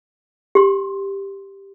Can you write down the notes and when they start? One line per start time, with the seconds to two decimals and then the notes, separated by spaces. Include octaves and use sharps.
0.55 G4 C6